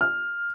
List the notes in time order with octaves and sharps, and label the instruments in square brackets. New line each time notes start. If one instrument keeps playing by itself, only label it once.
[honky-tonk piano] F6